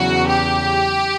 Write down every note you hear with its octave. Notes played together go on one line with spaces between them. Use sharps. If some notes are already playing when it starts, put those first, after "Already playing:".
Already playing: E2 C#3 F#3 F#4
G4